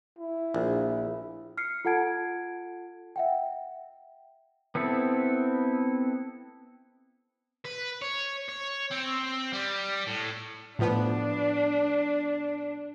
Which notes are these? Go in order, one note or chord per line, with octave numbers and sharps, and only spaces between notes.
E4
A#1
F6 C7 C#7
F4 A4 F#5 A5 G#6 D7
E5 F#5 G5
B3 C4 E4 A4
B4
C#5
C#5
C4
G3
A2
A2 F3 B3 D4